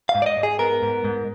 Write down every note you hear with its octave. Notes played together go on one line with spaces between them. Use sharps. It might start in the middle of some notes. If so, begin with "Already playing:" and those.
F5
G#2
D5
D#5
G#2
G#4
B3 A#4
G#2
G#2